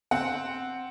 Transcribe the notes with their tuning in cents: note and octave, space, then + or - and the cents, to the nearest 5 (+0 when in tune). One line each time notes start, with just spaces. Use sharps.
C4 +0 F#5 +0